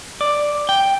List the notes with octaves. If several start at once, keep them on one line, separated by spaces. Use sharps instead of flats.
D5
G5